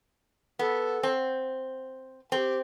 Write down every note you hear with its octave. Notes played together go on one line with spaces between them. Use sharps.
B3 A4
C4
C4 G4 A4